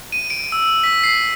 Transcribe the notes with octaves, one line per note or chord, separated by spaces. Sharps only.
D#7
D7
E6
B6
C7